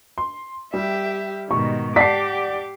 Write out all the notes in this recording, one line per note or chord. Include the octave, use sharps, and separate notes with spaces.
C6
G3 G4 E5
G#2 B2 D#3 C#6
G4 D5 F#5 A5 D6 B6 C7